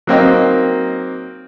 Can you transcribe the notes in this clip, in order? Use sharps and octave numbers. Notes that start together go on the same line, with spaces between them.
F#3 A#3 C4 D#4